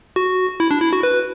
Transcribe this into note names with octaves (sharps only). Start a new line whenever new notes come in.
F#4
E4
D4
E4
F#4
B4